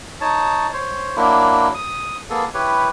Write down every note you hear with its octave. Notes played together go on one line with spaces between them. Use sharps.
D#4 C#5 A5
C5 C#5
F#3 A#3 D4 E4
D#6
A#3 B3 G#4 A4
E4 G4 B4 C#5